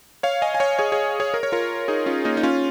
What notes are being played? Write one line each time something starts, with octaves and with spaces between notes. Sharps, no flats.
C#5 F5
D#5 G#5
G#5
C#5 F5
G#4 C#5
G#4 C#5
G#4 C#5
A#4
C#5
F4 A#4
D#4 G#4
C#4 F4
A#3 D#4
D#4
C#4 F4